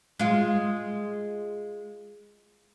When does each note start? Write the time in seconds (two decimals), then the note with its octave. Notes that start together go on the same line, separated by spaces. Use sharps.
0.19 G#3 F4